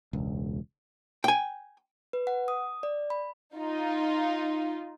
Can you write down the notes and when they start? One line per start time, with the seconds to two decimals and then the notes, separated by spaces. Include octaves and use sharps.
0.13 E1 C#2
1.24 G5 G#5
2.13 B4
2.27 F#5
2.48 D#6
2.83 D5
3.10 B5
3.56 D#4 F4